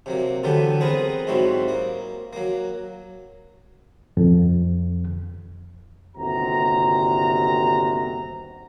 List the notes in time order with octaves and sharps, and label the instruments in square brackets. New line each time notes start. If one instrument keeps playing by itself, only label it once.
[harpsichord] C3 F#3 A#3
D3 E3 F#3 A3 B3 G4
B3 C4 G#4 A#4 B4
G#2 F#3 G3 C4 E4 F#4
A#3
F#3 A#3
[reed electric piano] F2
[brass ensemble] G1 D#2 C3 F#4 A#5